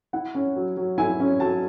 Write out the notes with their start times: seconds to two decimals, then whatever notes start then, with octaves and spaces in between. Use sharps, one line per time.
0.13 E4 F#5
0.35 C#4
0.56 F#3
0.77 F#3
0.98 E4 G#5
1.20 C#4
1.40 F#3 A5